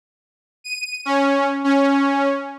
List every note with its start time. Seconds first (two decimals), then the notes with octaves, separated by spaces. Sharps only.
0.64 D#7
1.05 C#4
1.64 C#4